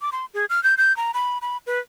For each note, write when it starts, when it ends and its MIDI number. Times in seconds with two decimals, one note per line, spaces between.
0.01 0.10 86
0.12 0.26 84
0.34 0.46 68
0.50 0.62 89
0.64 0.75 91
0.78 0.95 91
0.97 1.11 82
1.14 1.38 83
1.42 1.57 83
1.67 1.79 71